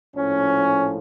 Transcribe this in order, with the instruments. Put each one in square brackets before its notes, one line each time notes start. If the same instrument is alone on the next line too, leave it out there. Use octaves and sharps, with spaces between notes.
[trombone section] A#1 A2 F3 C#4